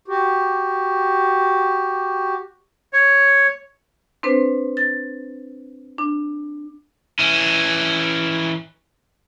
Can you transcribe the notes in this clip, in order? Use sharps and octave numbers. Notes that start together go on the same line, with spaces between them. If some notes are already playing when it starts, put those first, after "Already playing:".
F#4 G4
C#5
C4 D4 B4 C5
A6
D4
E3 C#4